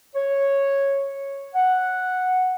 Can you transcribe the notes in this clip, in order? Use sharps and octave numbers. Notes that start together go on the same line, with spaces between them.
C#5
F#5